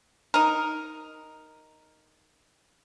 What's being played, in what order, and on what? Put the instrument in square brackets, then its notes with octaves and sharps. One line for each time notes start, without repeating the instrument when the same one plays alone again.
[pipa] D#4 A#4